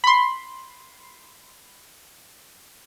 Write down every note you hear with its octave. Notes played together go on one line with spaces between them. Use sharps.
B5 C6